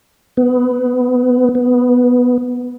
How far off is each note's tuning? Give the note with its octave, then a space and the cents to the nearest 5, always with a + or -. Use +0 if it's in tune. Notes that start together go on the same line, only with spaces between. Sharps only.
B3 +15
B3 +0